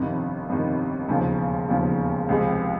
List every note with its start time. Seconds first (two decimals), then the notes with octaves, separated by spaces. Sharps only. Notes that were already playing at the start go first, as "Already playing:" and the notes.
Already playing: G1 F2 C3 D#3
0.49 G1 F2 C3 D#3
1.08 E1 D#2 C#3 F3
1.69 E1 D#2 C#3 F3
2.28 C#2 C3 F3 G#3